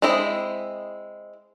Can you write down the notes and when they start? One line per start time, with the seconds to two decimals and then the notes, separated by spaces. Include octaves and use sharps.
0.02 G#3 C4 E4 D#5